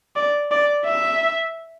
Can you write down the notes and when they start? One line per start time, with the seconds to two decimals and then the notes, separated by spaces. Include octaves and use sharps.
0.16 D5
0.51 D5
0.86 E5